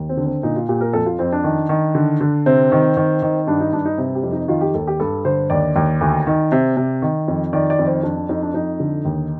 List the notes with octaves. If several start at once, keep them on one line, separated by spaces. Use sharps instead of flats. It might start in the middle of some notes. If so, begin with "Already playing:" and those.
Already playing: D#2
C4
D3
C4
A#2 D#4
F4
A#2 G4
A#4
F2 A4
F4
F2 C4
D4
D#3
D#3
D3
D3
C3 C4
D#3
D#3
D#3
G2 D4
D#4
G2 D4
D#4
C3
G4
F2
D#4
D#3 F4
G4
D#2 A4
G4
G2 A4
D3 C5
D#2 D5
D#2
D2
D#3
C3
C3
D#3
F2
D#3 D5
D5
F2
C5
F2 D4
D4
F2 D#4
D4
F2 D#4
D3
D#2